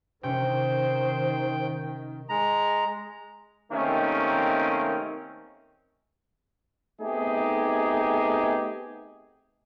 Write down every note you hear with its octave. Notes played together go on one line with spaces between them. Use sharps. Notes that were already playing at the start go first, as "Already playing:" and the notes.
C3 D#3 C#4 C5 G5
G#3 A#5
C3 D#3 A3 A#3 C4 C#4
A3 B3 C4 D#4 G4 G#4